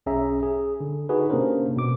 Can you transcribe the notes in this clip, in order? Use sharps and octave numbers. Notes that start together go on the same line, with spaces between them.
B1 C#4 G#4 E5 A#5
G#4
D3
D#4 F#4 G#4 B4
C3 A#3 C#4 D4 A#4 C5
B2 D6